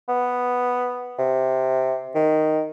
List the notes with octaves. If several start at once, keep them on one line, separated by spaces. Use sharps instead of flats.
B3
C3
D#3